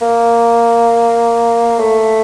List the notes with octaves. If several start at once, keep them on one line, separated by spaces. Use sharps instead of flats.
A#3
A3